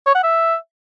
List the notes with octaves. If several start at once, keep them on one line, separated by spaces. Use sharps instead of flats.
C#5
F#5
E5